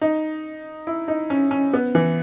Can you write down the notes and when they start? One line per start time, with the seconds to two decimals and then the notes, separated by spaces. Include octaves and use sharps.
0.01 D#4
0.87 E4
1.08 D#4
1.30 C#4
1.51 C#4
1.73 B3
1.95 E3